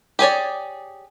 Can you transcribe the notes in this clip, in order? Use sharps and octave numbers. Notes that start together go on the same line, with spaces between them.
G4 G#4 C#5 D5